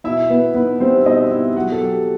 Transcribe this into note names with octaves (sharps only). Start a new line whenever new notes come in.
B2 E4 E5
B2 B3 B4
B3 D#4 B4
G3 C4 C5
B2 D#4 D#5
B2 E4 E5
F#3 F#4 F#5
A4
F#3 G4